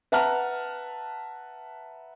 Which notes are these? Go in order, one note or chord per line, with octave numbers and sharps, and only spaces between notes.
B4 E5 F#5 A5 A#5 F6